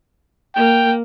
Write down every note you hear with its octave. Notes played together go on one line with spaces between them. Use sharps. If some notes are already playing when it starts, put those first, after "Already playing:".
A#3 G5